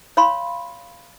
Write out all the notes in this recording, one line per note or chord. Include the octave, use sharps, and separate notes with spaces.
C#5 F5 B5 C6